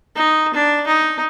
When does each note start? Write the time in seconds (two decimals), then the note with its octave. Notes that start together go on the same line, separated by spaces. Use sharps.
0.16 D#4
0.54 D4
0.87 D#4